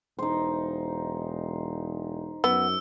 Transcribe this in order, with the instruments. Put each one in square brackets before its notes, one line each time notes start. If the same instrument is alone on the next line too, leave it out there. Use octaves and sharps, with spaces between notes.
[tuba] E1 [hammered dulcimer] D#4 C5
[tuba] F#2 [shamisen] B3 [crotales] E6